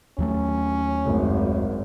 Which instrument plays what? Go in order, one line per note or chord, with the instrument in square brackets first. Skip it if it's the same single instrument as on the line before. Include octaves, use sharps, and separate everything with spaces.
[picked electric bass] D#2 F#3 A3 [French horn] C#4
[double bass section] G#1 F#2